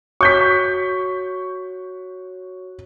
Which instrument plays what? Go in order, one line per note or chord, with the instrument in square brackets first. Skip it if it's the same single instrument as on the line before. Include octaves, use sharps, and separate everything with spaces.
[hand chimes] F#4 C#5 F#6 [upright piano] C#6 G6 B6